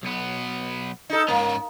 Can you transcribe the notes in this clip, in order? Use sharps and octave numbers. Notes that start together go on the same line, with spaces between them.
B1 B3
D#4 A4
G#2 A#3 C#4